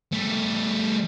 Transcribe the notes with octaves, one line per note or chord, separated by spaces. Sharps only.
G3 A3